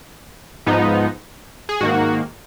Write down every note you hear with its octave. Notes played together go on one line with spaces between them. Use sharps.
G#2 F3 B3 D#4
G#4
G#2 D#3 A#3 F#4